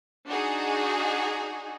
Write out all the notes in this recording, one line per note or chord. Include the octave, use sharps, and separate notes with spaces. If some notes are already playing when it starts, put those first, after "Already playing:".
D4 D#4 F#4 G#4